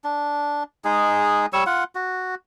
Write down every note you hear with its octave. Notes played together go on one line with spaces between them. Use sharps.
D4
G#3 D#4 G#4
G3 C#5 C#6 E6
F4 F#5
F#4